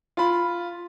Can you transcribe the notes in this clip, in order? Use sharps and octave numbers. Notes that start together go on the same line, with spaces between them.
F4 B5